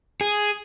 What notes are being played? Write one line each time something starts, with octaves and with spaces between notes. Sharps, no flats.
G#4